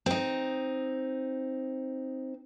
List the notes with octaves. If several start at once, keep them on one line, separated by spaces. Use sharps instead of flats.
C4 D#4